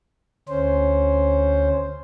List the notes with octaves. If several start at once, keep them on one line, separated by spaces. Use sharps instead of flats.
D2 C#4 C5